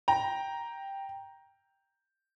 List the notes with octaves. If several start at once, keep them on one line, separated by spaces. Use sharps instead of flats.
G5 A#5